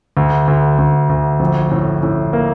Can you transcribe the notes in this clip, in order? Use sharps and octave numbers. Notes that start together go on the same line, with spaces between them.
D2
D2
D2
D2
A#1
A2
A2
A#3